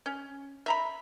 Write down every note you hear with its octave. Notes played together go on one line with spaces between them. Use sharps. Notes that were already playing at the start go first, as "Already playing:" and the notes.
C#4
E5 A#5 B5